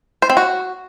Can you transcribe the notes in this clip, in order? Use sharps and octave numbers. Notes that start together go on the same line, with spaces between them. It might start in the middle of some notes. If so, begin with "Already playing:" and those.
C5
C4
F#4